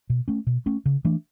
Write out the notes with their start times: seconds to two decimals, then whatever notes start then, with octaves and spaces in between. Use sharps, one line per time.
0.10 B2
0.28 A3 C#4
0.47 B2
0.66 A3 C#4
0.86 C#3
1.05 E3 A3 D4